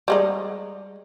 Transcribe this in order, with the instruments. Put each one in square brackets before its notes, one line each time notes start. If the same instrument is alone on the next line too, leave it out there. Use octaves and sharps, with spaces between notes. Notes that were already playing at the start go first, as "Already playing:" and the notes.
[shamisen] G3 G#3 D#4